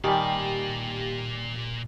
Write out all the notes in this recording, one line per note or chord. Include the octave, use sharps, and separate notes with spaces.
A#2 D#3 G3 G4 D5 G5 G#5